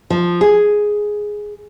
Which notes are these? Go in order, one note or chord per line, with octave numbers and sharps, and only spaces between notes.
F3
G#4